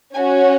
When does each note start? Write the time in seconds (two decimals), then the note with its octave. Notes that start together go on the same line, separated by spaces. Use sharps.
0.14 C#4 G#5
0.19 F#4